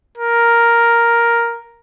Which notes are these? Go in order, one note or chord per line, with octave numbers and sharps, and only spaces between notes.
A#4